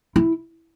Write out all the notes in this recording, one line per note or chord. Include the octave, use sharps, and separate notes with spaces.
E4